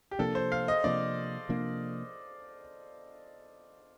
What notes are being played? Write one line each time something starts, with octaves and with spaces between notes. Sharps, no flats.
G4
C3 F3 A#3 D4 A4
C5
F5
D#5
C3 F3 A#3 D4 D5
C3 F3 A#3 D4